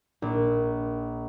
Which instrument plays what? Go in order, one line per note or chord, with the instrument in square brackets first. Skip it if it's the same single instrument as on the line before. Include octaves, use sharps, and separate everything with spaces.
[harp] A#1